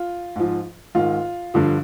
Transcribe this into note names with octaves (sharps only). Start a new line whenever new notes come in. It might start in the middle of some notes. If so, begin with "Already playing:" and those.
Already playing: F4
G#2 F3
G#2 D#3 F4
G2 D3 F3